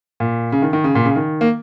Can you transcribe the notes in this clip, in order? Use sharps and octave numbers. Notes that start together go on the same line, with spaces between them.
A#2
C#3
D#3
D#3
C#3
A#2
C#3
D#3
A#3